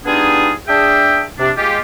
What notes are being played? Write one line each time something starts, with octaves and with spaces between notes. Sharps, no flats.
G3 B3 D4 D#4 F4 G#4
D4 G#4 E5 G5
C3 D4
G#3 A#3 F4 G4